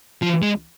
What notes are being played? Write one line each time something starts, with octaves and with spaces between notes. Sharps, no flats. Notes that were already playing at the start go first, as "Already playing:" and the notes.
F3
G#3